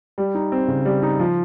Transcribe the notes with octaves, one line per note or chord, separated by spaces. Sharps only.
G3
D#4
C4
C#3
G3
D#4
F3